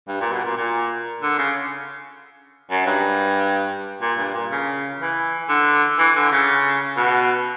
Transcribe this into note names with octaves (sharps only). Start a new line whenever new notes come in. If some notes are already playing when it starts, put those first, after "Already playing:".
G2
A#2
B2
A#2
A#2
D3
C#3
F#2
G2
A#2
G2
A#2
C#3
E3
D3
E3
D3
C#3
B2